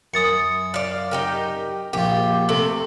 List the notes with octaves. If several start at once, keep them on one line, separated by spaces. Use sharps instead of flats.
F#2 D#6 A6 C#7
D5 F5
D#4 G4 A#4
A#1 F4 G4
C3 A3 A4